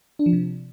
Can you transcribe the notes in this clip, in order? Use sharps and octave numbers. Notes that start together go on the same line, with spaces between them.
D4
F3
C3